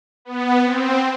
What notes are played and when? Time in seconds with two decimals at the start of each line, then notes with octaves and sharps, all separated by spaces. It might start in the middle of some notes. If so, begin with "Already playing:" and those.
0.25 B3
0.64 C4